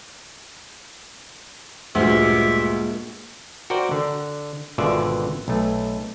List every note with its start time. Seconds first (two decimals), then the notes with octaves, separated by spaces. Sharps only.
1.95 D2 G2 A#2 G#3 A#3 F4 E5
3.70 F#4 A#4 C5 D5 G5
3.91 D3
4.78 G#1 B2 D3 F4 D5 E5
5.48 B1 A3